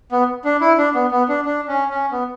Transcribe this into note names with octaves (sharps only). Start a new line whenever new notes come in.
B3
D4
E4
D4
B3
B3
D4
D4
C#4
C#4
B3